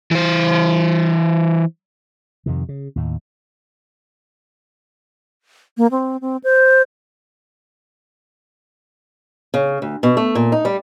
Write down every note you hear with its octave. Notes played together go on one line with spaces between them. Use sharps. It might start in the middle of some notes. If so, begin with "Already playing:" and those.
E3 C5
F2 C3 D#3
C#3
D#2 A2
A#3
C4
C4
C5
C#3
D2
B2
A3
A#2
D#4
G3